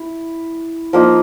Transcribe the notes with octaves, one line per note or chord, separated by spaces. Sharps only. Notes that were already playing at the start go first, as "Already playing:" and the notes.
Already playing: E4
F3 A#3 D#4